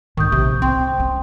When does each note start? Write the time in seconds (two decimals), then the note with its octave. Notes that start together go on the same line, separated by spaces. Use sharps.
0.17 G#2 D#3 G#3 C#6 D#6 G6
0.32 A#1 C3 F3
0.62 C2 C4 G5 C6
0.98 G#3 C#4